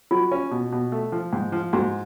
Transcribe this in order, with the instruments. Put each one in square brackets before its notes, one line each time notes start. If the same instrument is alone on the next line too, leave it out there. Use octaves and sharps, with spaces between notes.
[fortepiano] F#3 [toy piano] F4
[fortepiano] C#4
B2
B2
A3
F3
G#2
F3
[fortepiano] G#2 [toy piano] F#4